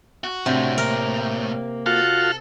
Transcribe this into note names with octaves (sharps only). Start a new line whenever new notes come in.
F#4
A2 C3 D4 F#4
A#3 A#4
F4 F#4 A4 F5